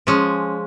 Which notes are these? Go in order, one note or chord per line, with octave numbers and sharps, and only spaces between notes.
F3 G#3 C#4